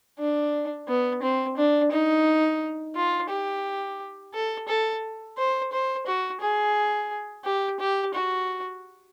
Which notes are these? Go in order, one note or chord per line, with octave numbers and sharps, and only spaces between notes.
D4
B3
C4
D4
D#4
F4
G4
A4
A4
C5
C5
F#4
G#4
G4
G4
F#4